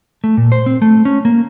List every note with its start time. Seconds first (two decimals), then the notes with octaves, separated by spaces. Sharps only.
0.24 A3
0.37 A#2
0.52 C5
0.66 C4
0.82 A3
1.05 C#4
1.25 A#3